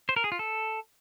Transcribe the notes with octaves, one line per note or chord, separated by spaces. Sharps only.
C5
A#4
G#4
F4
A4